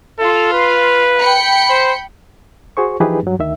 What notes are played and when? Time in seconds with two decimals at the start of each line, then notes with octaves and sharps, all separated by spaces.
0.19 F4 A4 F5
0.53 B4
1.18 G5 B5 C#7
1.70 C5
2.77 F#4 G#4 C5 C#6
3.00 E3 F3 D#4 G4 G#4 B4
3.23 G2 F#3
3.39 D2 D#3 E5